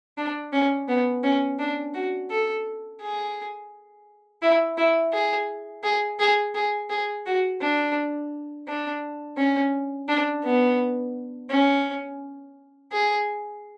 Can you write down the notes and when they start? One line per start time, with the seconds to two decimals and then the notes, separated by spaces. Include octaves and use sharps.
0.18 D4
0.53 C#4
0.88 B3
1.24 C#4
1.59 D4
1.94 F#4
2.30 A4
3.01 G#4
4.42 E4
4.78 E4
5.13 G#4
5.84 G#4
6.19 G#4
6.55 G#4
6.90 G#4
7.26 F#4
7.62 D4
8.68 D4
9.37 C#4
10.08 D4
10.45 B3
11.50 C#4
12.92 G#4